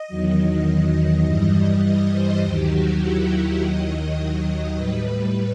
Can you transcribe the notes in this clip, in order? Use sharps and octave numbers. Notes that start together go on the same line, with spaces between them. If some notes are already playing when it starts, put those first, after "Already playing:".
Already playing: D#5
E2 D#3 F#3
G2 E3 G3 D#5
D#5
C5
D#2 D#3 F#3 G4
F#4
E4
D#2 D#3 F#3 D#5
A2 G3 B4
B4